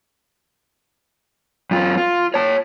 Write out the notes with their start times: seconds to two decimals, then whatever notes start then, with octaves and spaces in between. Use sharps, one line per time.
1.71 F#2 F4
1.98 F4
2.34 C#5 A5